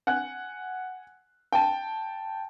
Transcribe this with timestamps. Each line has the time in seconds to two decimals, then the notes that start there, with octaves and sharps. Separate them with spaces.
0.07 F#5 G#5 F#6
1.52 G5 A5